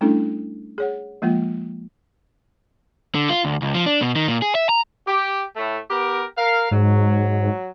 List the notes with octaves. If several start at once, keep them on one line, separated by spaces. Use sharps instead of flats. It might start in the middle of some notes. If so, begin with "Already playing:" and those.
G3 A3 C#4 D4 E4 A4
G#4 C#5 F#5
F3 G#3 A#3 F4 G5
D3
F4
D2
C#2
F3
D4
B2
D#3
A#2
G#4
E5
A#5
G4
A2 A3
B3 G4 A#4
A#4 F5
G#2 F#3